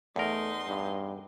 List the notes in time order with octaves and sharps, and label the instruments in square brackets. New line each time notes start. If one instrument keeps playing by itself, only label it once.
[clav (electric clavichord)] E2 A#4 [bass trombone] A3 [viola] D#4 C6
[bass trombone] G2